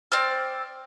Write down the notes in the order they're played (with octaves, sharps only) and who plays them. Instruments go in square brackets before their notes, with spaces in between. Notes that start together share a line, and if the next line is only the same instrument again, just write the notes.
[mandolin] C4 D5 F6